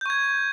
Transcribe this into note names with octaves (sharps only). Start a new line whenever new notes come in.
C#6 G6 G#6